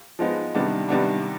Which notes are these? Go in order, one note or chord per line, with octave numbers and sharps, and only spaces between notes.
F3 G#3 B3 D#4
C3 D#3 G3 B3 D4
C3 D#3 G3 B3 D4